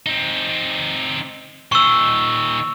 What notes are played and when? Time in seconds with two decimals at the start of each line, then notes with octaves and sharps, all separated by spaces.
0.06 C4 D#4
1.72 A#2 D#3 C#6 E6